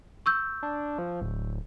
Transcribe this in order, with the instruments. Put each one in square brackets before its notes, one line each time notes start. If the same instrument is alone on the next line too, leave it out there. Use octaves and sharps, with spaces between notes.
[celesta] C#6 E6 G6
[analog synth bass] D4
F3
D1